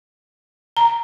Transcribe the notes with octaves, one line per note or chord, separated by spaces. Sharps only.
A#5